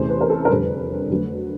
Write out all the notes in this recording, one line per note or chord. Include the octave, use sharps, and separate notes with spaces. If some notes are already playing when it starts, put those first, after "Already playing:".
Already playing: E2 C3 E3 A3 C#4 C5
B4
A#4
A4
A#4
F2 D3 G3 B4
D3 F#3 A3